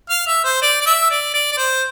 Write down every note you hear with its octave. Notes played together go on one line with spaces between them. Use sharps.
F5
E5
C5
D5
D5
E5
D5
D5
D5
C5